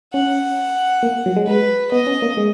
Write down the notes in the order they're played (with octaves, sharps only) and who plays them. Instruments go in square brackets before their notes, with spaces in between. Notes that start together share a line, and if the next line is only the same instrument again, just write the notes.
[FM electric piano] C#4 [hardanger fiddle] F#5
[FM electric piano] A#3
F#3
G#3
[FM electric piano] G#3 [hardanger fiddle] B4
[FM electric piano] B3 [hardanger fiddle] D#5
[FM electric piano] C#4
A#3
G#3